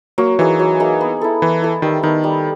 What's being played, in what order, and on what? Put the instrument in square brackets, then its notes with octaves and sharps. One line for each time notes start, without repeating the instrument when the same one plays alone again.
[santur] F#3 [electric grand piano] A#3
[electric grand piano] E3 [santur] A#3 D#4 G#4
[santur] F#3
A#3 D#4 G#4
B3
E4 A4
[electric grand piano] E3 [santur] B3
[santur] E4 A4
[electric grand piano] D#3 [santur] G3
[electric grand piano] D#3 [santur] B3 D#4
[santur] G3